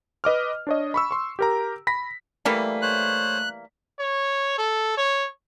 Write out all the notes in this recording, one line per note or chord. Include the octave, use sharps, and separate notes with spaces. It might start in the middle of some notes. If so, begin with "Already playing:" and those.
B4 D#5 D6 F6
D4 C#5 D#5
B5 C#6 E6
C6 C#6
G4 A#4 A#5
B5 A#6 B6
E3 G3 A3 A#3 B6
C5 C#5 F#6
C#5
A4
C#5